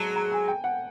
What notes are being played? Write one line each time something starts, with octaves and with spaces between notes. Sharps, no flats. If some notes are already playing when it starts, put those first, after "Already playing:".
Already playing: F#3 G#3 A5 A#5
A#5
G#5
G5
F#5